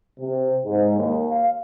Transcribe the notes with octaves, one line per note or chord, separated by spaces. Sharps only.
C3
G#2
D#2
F5